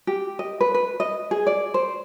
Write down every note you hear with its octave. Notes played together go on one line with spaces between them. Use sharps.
G4
D#5
B4
B4
D#5
G#4
D5
C5